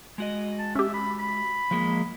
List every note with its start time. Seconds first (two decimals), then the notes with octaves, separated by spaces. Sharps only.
0.18 G#3 F#4 D#5
0.59 A5
0.75 C#4 G4 E5
0.94 B5
1.19 B5
1.71 F3 G#3 A#3